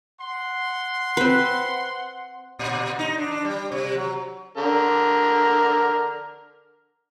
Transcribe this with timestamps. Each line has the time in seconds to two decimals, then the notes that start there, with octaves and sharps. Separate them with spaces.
0.20 F#5 C6
1.17 C4 B4
2.59 A#2
2.99 D#4
3.18 D4
3.31 D4
3.45 G3
3.72 C3
3.95 F#3
4.57 D3 A#4